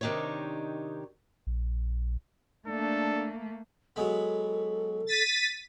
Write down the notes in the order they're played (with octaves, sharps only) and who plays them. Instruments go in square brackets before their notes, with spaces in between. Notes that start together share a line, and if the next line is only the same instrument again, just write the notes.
[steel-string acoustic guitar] C3 D#3 D4 D#4 G4 C#5
[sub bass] A#1
[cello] A3 A#3 [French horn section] D4 [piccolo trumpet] A4
[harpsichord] F#3 G#3 B3 [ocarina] A4
[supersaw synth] A6 B6 D#7